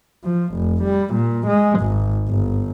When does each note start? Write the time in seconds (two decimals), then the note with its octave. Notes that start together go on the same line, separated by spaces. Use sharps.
0.24 F3
0.55 F1
0.84 G3
1.15 A#2
1.47 G#3
1.80 G#1
2.29 G1